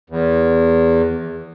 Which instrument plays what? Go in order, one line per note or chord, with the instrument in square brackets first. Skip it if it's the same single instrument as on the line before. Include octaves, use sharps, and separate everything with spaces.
[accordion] E2